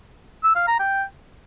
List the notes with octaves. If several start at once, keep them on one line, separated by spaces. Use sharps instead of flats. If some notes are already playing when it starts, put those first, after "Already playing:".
E6
F5
A#5
G5